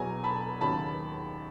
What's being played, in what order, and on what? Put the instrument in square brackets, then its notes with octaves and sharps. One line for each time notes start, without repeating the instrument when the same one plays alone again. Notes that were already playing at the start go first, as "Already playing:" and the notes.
Already playing: [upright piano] E2 B2 F#3 G#5 A#5
A5 B5
D#2 C#3 F#3 A5 B5